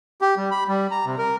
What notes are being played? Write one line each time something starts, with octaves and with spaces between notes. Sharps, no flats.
G4
G3
B5
G3
A#5
C3
A#4